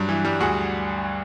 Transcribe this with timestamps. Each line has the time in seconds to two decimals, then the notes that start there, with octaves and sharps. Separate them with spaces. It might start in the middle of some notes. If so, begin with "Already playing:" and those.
Already playing: G2 F#3
0.09 E3
0.25 G3
0.40 D2 F#4 G#4